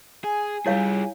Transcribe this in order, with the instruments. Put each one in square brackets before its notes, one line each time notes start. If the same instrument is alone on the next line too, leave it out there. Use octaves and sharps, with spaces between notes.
[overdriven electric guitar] G#4 [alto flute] G#5
[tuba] G3 [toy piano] E4 C#5 F5 [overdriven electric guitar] F4 G#4